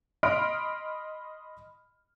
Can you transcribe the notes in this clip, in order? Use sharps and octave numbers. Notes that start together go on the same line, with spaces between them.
D#5 B5 C6 F6 D7